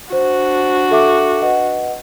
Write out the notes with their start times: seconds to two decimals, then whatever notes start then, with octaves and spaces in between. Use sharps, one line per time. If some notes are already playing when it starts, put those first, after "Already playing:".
0.12 D4 F#4 C5
0.91 A4 E5 D6
1.41 B4 D#5 F#5